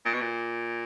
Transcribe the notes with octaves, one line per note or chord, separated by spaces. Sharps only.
A#2
B2
A#2